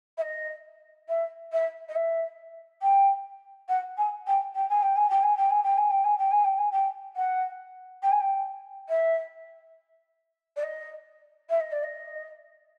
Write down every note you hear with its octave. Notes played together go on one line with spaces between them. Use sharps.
E5
D#5
E5
E5
D#5
E5
G5
F#5
G#5
G5
G5
G#5
G5
G#5
G5
G#5
G5
G#5
G5
G#5
G5
G#5
G5
G#5
G5
G#5
G5
F#5
G5
G#5
G5
E5
D5
D#5
E5
D#5
D5
D#5